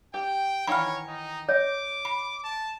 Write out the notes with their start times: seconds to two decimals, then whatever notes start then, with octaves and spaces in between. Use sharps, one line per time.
0.14 G4 G5
0.67 D#3 E3 C#5 F#5 B5 F6
1.08 D#4
1.49 C#5 D#5 D6
2.05 B5
2.44 A5